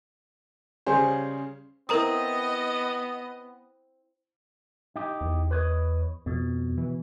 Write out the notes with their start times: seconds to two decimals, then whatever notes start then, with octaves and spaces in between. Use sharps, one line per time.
0.86 C#3 G3 C#4 G#4 C5
1.89 B3 C4 E4 A#4 D#5 A#5 D#6
4.96 D#4 G4
5.21 E2
5.51 B4 C#5 D#5
6.26 F2 B2
6.78 E3